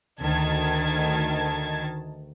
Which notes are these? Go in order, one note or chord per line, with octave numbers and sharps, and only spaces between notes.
D2 D#3 A5 G#6